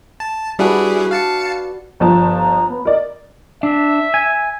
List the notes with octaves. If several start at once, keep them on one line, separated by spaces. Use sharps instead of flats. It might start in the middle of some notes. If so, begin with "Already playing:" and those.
A5
G3 D4 E4 F#4 G#4 B4
F5 A5 C#7
G1 F3 A5 A#5
A#5
B3
A#4 D5 D#5
D4 E5
G#5